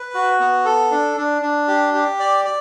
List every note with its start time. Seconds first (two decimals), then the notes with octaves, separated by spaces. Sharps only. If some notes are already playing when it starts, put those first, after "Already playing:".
Already playing: B4
0.14 F#4
0.40 B3
0.65 A4
0.91 D4
1.17 D4
1.42 D4
1.68 G4
1.94 G4
2.20 D5
2.45 D5